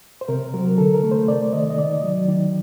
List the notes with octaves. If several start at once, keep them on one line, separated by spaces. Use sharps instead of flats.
C5
C3 A#4
F#3 A#4
D3 A4
A#4
A3
C5
C3 D5
D#3 D#5
D#5
D#3 D5
F#3
D#3